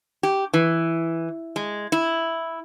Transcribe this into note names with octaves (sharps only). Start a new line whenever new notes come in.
G4
E3
G#3
E4